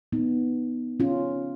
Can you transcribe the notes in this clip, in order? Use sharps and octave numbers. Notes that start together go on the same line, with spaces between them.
B3 D#4
C#4 F4